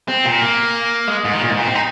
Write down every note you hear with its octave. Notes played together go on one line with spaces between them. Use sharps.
C4
A#2
A#3
G#3
G#2
D#3
A#2
G#2
A#2
C4
D#4